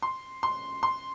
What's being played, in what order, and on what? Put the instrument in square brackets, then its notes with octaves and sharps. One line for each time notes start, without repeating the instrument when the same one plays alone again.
[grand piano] C6
C6
C6